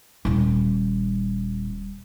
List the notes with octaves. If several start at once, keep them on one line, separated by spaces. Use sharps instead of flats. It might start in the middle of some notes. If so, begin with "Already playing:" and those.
D#1 G3